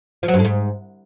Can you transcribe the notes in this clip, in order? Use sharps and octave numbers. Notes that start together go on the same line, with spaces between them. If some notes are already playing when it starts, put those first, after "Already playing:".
F3
F#3
G2
A2
G#2